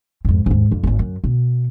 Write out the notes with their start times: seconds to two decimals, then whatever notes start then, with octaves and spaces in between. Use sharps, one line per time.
0.25 F2 G#2
0.46 D#2 G#2
0.71 F2 D3
0.84 D#1 G#1
0.99 F#2
1.24 B2